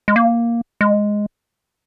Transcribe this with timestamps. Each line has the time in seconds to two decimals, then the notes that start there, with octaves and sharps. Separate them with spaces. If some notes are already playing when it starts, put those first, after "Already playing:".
0.08 G#3
0.16 A#3
0.81 G#3